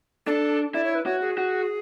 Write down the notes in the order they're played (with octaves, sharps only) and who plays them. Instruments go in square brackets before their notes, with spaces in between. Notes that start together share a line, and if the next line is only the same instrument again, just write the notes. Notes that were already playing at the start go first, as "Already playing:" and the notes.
[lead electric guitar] D4 [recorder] A4
[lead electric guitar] E4 [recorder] D5
[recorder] C#5
B4
[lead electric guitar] F#4 [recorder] C#5
[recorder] G#4
[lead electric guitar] F#4